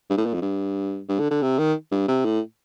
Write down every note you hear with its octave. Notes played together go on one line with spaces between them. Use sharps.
G2
A2
A#2
F2
G2
G2
D3
D3
C3
D#3
G2
C3
A2